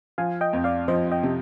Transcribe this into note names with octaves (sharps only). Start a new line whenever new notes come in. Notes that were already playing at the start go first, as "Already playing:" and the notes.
F3 F5 G#5
D#5 G5
F2
D5 F5
F3 C5 D#5
D#5 G5
C3